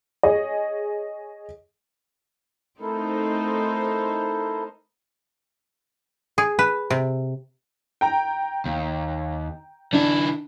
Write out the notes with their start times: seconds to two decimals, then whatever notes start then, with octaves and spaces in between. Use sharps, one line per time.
0.23 G#4 C#5 D#5
2.81 A3 C4 D#4 E4 A4 A#4 C5
6.38 G#4
6.59 B4
6.90 C3
8.01 G5 A#5
8.65 D#2
9.93 D#3 D4 E4